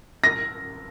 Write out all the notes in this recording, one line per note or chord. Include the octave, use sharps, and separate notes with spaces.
A#6